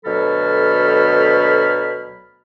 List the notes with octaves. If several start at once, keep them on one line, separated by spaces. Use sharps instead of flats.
D2 B2 F#3 A4 B5 F6